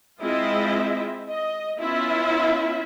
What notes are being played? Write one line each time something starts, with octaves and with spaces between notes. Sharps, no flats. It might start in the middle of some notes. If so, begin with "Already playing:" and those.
G#3 C4 E4 F4 D#5 E5
D#5
B3 C#4 E4 F4 E5